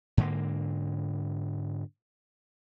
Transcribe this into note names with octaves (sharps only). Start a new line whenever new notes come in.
G#2 D3 A#3